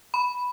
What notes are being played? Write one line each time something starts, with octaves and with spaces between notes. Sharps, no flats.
B5